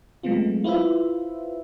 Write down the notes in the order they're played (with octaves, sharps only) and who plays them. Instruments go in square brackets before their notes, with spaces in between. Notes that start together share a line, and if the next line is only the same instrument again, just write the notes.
[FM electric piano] F#3 G#3 A3 B3 C4 F4
E4 F4 B4 C5 E5